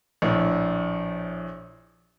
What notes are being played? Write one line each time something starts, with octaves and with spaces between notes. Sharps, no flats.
A#1 A2